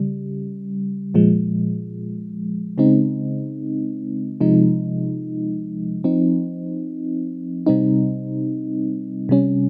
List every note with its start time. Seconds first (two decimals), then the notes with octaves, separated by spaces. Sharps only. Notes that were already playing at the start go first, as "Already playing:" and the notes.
Already playing: C#3 G3
1.14 A#2 F3 G#3
2.78 C#3 G#3 C4 D#4
4.41 C3 F3 G#3 D#4
6.04 F3 C4 D#4
7.66 C3 G3 C4 D#4
9.29 C3 G3 C#4